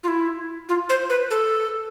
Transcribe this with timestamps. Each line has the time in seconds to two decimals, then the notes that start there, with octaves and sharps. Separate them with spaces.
0.03 F4
0.08 E4
0.69 F4
0.89 C5
1.10 B4
1.31 A4